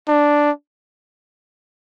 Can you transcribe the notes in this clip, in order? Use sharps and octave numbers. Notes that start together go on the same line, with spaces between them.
D4